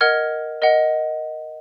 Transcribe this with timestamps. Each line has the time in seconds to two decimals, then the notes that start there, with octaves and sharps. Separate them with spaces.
0.01 A#4 D#5 F#5 F6 G#6
0.62 A#4 D#5 F#5